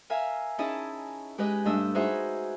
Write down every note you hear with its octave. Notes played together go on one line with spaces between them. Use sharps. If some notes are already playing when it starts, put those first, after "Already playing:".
A#4 E5 F5 G#5
C#4 D#4 E4 G#4 D#5 A5
G#3 G4 G#4 B4 D#5
G2 A3 D4 D#5 E6
D#4 F#4 G#4 B4 C5 E5